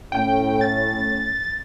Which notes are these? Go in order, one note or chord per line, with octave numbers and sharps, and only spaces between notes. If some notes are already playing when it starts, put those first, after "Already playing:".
A2 C#4 G5
A6